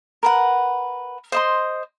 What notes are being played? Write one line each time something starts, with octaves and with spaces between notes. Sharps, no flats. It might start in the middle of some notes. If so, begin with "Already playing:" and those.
A#4 B4 F#5
C5 D#5 C6